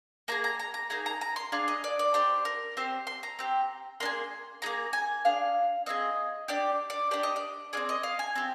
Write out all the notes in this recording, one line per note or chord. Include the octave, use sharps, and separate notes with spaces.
A#3 F4 G#4 A#5
A#5
A#5
A#5
A#3 D#4 G#4 A#5
A#5
A#5
C6
D4 G#4 F5
D#5
D5
D5
D4 G4 C5
A#4
C4 G4 C5
C6
A#5
C4 G4
A#3 D4 C6
G#4
A#3 D#4 G#4 A#5
G#5
D4 G#4 F5
C4 F4 G#4 D#5
D4 G4 D5
D5
D4 G4 D5
D#5
D5
C4 F4 G#4 D5
D#5
F5
G#5
C4 G4